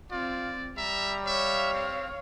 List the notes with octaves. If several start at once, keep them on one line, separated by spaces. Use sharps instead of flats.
C4 F4 D5
G3 E5 A#5
C#5 E5 F5
C4